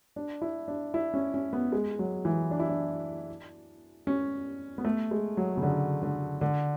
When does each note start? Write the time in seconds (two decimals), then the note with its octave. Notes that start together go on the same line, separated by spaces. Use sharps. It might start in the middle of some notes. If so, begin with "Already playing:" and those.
0.16 D4
0.42 E4
0.68 D4
0.94 E4
1.14 C#4
1.34 C#4
1.53 B3
1.72 G#3
1.99 F#3
2.25 E3
2.51 D4
2.60 E4
2.69 D4
4.07 C#4
4.78 B3
4.85 A3
5.11 G#3
5.37 F#3
5.57 C#3
5.63 D3
6.03 D3
6.41 D3